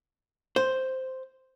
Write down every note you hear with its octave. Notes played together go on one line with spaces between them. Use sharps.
C5